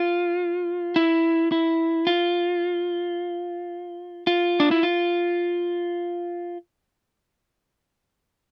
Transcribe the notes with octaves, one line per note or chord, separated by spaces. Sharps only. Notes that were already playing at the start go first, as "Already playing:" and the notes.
Already playing: F4
E4
E4
F4
F4
D4
E4
F4